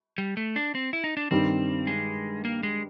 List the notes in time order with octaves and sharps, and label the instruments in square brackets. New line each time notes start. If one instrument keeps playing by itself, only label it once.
[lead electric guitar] G3
A3
D4
C4
E4
D#4
D4
[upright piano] G2 D#3 G3 [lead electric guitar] C4
[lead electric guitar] G#3
A#3
G#3